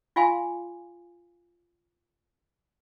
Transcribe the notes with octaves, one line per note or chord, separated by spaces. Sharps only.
F4 F5 G#5 C6